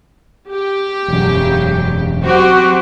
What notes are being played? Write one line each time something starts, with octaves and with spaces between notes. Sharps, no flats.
G4
E1 F#2 C#3 F#3
F#3 C4 F#4 G4 C5